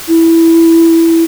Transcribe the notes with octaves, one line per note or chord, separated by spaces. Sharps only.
E4